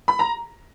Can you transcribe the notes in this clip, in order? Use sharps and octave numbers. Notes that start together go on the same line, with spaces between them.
B5
A#5